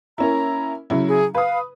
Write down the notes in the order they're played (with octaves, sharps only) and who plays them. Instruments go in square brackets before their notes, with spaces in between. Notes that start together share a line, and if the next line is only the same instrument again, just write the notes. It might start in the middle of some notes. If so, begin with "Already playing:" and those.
[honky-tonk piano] A#3 C#4 E4 [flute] A#5
[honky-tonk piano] C#3 F#3 E4
[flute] G#4
[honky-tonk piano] B4 D#6 [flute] F5